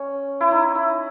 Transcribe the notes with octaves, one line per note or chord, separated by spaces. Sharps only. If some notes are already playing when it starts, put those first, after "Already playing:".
Already playing: C#4
E4
D#4
E4